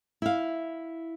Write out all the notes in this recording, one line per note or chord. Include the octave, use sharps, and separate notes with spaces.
E4 F5